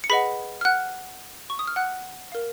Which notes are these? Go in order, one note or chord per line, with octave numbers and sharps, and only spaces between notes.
C#7
G#4 B4 D#5 F#5 B5 B6
F6
F#5 F#6
C#6
D#6
F6
F#5 F#6
A#4 F5